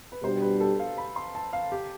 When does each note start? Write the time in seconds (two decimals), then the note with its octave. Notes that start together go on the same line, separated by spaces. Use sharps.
0.12 B4
0.23 B2 G3 D4 G4 C5
0.42 B4
0.60 A4
0.80 F5
0.98 B5
1.16 C6
1.35 A5
1.53 F5
1.72 G4